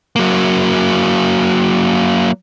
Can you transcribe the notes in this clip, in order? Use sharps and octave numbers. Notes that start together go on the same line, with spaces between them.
F#3 A#3